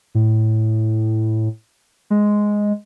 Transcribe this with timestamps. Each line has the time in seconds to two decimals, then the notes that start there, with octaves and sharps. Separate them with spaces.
0.15 A2
2.10 G#3